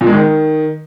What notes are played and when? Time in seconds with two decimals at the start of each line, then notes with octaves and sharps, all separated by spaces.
0.01 A#2
0.07 G#3
0.13 D#3